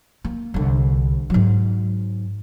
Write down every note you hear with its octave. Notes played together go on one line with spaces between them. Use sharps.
A#3
C2 D3
G#2 F#3